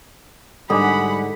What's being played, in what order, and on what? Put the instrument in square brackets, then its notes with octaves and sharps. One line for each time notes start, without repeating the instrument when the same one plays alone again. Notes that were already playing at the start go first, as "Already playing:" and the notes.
[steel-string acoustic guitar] G#2 D3 [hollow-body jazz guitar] G3 [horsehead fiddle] F#5 B5 [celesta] G#5 D6 D#6